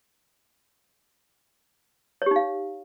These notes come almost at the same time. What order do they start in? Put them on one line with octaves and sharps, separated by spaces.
C#5 G4 D#4 F5